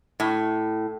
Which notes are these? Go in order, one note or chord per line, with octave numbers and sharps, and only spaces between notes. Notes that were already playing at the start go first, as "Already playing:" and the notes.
A2